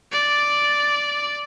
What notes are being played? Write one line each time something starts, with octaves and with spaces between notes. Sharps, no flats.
D5